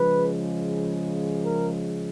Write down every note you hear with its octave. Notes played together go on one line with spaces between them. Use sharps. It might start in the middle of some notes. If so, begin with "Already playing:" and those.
Already playing: C#3 F3 G#3 B4
A#4